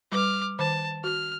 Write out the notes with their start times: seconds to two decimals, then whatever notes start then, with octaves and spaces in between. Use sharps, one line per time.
0.12 G3 B4 D6 F6
0.59 D#3 C5 A5 D6
1.04 F#4 F6